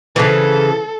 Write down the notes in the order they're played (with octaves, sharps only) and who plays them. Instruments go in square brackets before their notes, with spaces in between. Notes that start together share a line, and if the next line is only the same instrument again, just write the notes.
[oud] C#3 E3 [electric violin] A4